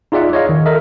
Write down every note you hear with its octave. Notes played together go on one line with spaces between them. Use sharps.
D#4 F4 G#4 D5 E5 F#5
C#5 D#5 F5
D#3
A4 A#4 D#5 E5